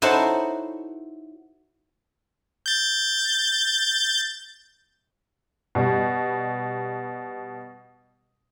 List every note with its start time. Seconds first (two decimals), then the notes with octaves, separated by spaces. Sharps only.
0.02 D#4 E4 F#4 A4 C5 C#5
2.66 G6 A6
5.75 B2 G3